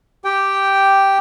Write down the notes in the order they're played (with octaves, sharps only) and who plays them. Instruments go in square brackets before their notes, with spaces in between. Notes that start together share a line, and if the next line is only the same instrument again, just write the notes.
[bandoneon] G4 G5